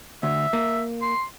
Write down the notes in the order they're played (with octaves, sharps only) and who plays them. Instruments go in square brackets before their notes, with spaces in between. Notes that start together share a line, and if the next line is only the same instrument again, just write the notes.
[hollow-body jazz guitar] D2 [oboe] E5
[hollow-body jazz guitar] A#3
[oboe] C6